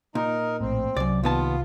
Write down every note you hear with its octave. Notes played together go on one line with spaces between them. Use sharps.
A#2 D#4 A#4
A#1 A2 C4
C2 F#2 D5
D#2 B3 F4 A5